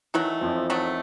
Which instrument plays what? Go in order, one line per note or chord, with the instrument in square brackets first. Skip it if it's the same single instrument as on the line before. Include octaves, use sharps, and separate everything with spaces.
[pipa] D#3 F#3 A3 [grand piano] E3
[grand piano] F2 F3
[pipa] D#3 F#3 A3